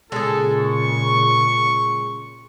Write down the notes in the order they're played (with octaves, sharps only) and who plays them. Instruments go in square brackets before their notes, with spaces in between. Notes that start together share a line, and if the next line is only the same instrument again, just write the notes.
[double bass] A#2 C#3 [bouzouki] G#3 G#4 [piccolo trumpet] A4
[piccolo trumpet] C#6